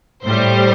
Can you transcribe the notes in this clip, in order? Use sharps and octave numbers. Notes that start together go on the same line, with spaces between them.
A2 G3 C5